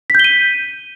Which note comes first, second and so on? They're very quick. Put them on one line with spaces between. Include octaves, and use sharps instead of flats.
B6 G6 G7 D#7